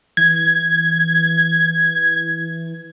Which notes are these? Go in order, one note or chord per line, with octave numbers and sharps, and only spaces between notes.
E3 G#6